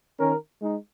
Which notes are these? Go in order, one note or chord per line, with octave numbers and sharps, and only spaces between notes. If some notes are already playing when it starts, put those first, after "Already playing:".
D#3 C#4 A#4
G#3 D#4